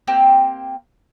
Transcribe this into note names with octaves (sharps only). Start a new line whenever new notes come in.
A#3 C4 G4 C5